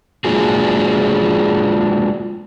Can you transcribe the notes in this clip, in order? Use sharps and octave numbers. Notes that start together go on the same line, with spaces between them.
G#3 A#3 D4 F4 F#4 G#4